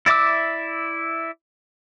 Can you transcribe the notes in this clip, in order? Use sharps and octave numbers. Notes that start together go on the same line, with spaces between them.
E4 D5 E5 D6 E6